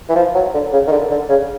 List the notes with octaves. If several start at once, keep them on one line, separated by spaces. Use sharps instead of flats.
E3
F3
F#3
D3
C#3
D#3
D3
D3
C#3